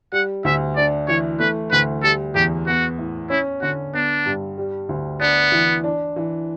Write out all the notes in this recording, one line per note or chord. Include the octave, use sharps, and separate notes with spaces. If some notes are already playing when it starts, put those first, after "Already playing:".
G3 F#5
D2 E5
D4 D5
E3 C#5
A3 B4
D2 B4
G3 A4
E2 G4
B3 F#4
A2
C#4 E4
D3 F#4
B3 D4
G2
G3
D2
B3 D4
E3
D4
E3